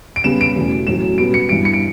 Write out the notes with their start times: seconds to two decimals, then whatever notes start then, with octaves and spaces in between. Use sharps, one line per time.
0.16 D7
0.24 C#3 G3 B3 E7
0.41 D7
0.56 E2 B2 A3
0.87 A2 F#3 C#4 E7
1.18 B2 G3 B3 D7
1.34 C#7
1.49 G2 E3 B3 D7
1.65 C#7
1.74 D7